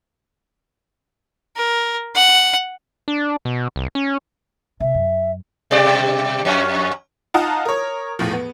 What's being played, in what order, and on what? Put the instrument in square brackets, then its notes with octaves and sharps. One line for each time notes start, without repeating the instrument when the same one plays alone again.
[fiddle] A#4
F#5
[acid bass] D4
B2
C2
C#4
[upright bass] C3 [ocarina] E5
[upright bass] F#2
[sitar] B2 G3 D5
F2 C#4
[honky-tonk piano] D#4 F4 F#5 A5 A#5 D#6
A#4 C#5
E2 A2 F3
B3